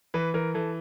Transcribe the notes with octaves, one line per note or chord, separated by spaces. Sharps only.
E3 B4
E3 A#4
E3 A4